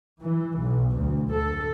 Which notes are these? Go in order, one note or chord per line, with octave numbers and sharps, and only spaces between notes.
E3
B1
D2
A4